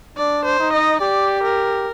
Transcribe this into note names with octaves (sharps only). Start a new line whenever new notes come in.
D4 D5
C5
D#4
D#5
G4 D5
A#4